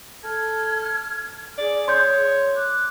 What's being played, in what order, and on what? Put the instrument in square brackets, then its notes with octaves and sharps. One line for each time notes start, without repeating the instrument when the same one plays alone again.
[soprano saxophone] A4 [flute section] F6 G#6
[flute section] G#4 [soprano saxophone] D5
[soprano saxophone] C#5 [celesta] C6 G6
[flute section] D6 F#6